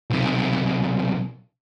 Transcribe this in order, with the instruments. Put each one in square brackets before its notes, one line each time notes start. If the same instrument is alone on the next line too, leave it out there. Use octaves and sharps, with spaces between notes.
[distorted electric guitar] B1 C3